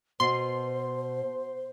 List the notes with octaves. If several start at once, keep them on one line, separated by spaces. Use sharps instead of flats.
B2 C5 C6